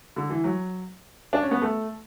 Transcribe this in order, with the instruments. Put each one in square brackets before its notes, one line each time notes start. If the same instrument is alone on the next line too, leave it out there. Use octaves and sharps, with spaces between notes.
[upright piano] D3
E3
F#3
D4
C#4
B3
A3